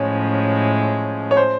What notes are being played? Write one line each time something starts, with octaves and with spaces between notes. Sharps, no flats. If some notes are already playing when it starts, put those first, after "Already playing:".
Already playing: A2 F3 G#3 C#4 C#5
C#5
C5